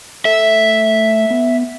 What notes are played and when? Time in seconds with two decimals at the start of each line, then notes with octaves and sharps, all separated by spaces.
0.25 A3 E5
1.30 B3